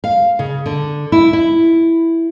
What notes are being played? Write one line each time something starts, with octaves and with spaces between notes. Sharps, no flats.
F5
C#3
D3
E4
E4